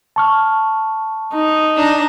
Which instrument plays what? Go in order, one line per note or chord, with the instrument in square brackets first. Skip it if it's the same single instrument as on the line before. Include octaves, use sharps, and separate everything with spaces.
[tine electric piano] A5 C#6 F6
[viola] D#4
[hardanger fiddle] D4 A#5